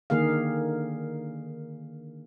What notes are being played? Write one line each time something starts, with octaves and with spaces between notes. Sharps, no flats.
D3 D#3 A#3 G#4 F5